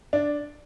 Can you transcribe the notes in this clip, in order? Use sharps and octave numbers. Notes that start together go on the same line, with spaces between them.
D4